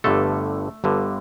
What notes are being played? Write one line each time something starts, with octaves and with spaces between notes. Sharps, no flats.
G1 G2 D3 A3 A4
G1 G2 D3